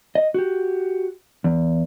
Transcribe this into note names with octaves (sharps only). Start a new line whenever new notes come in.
D#5
F#4 G4
E2